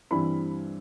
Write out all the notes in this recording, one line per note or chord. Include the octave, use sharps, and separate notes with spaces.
G2 E3 G3 C4 B5